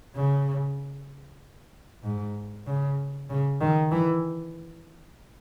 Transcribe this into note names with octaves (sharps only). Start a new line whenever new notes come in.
C#3
G#2
C#3
C#3
D#3
E3